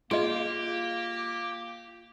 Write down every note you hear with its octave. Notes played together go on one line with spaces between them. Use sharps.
A#3 F4 G4 G#4 D#5